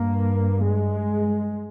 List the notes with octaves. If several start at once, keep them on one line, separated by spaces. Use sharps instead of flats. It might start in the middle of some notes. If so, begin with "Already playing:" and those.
Already playing: G2 A#3
G#3